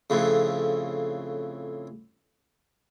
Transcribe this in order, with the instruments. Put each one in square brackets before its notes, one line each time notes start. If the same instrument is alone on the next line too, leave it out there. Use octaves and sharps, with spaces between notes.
[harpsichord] F2 A2 C#3